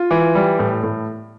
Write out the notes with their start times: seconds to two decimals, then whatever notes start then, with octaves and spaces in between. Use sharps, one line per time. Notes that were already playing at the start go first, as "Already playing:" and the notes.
Already playing: F4
0.11 E3
0.35 G3
0.59 A2
0.83 A2